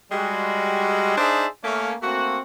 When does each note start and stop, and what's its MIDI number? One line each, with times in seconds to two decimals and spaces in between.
0.12 1.16 55
0.12 1.16 56
0.12 1.16 66
1.17 1.47 62
1.17 1.47 63
1.17 1.47 68
1.17 1.47 72
1.17 1.47 74
1.17 1.47 76
1.64 1.94 57
1.64 1.94 58
1.64 1.94 61
2.02 2.40 57
2.02 2.40 58
2.02 2.40 60
2.02 2.40 66